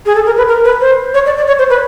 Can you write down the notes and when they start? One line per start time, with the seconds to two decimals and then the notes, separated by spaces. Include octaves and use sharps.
0.06 G#4
0.15 A4
0.26 A#4
0.37 B4
0.48 A#4
0.65 B4
0.81 C5
1.14 C#5
1.26 D5
1.37 D5
1.47 C#5
1.59 C5
1.70 B4